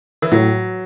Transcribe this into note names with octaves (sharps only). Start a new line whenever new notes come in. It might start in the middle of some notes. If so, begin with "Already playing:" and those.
E3
A2 F#3